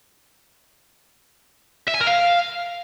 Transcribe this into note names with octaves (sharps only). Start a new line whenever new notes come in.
E5
G#5
A#4
F5